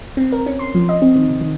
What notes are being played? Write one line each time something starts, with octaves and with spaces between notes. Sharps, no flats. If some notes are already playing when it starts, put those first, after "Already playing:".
C4
A#4
C#4
C6
F3
D#5
C4
D#3
C3
D#3